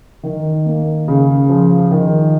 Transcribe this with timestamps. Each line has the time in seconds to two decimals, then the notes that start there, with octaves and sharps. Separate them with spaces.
0.23 D#3
0.66 A#3
1.08 C#3
1.49 F3
1.91 D#3